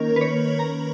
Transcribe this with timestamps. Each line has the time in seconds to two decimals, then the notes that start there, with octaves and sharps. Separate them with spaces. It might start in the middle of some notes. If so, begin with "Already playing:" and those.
Already playing: D#3 A#3 C#4 A#4
0.16 B4
0.21 C#5
0.59 A#5